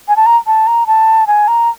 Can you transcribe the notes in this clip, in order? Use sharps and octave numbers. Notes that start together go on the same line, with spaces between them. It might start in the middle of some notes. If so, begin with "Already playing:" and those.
G#5
A5
A#5
A5
A#5
A5
G#5
A#5